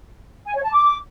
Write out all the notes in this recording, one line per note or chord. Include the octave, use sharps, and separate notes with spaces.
G#5
C#5
A5
D6